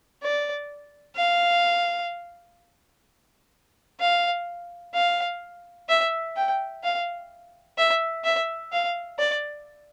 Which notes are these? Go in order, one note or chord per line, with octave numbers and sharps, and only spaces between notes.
D5
F5
F5
F5
E5
G5
F5
E5
E5
F5
D5